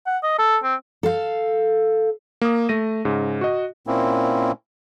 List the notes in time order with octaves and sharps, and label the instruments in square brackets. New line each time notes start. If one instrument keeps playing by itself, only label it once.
[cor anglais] F#5
D#5
A4
C4
[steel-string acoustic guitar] A4 F5
[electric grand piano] A#3 D#6
A3 A#6 D#7
G#2 C#3
F#4 D#5
[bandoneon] A#2 A#3 C4 C#4 E4